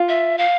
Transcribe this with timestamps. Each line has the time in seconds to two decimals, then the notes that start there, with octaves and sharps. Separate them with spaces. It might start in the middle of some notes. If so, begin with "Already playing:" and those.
Already playing: F4
0.09 E5
0.38 F5